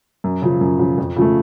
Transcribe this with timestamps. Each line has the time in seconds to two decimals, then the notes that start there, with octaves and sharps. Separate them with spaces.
0.24 F#2
0.42 C#3 F3
0.61 F#2
0.79 C#3 F3
0.98 F2
1.16 C#3 F3 A3